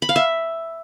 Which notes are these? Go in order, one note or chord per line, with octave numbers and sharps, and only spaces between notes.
B5
F5
E5